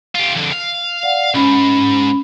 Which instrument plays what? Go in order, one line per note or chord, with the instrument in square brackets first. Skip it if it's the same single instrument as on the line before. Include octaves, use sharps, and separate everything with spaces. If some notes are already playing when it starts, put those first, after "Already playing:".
[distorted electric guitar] F4 G4
F2 D3
F5
[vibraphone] D5 F#5
[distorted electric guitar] B1 G#2 [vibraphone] C#4 B5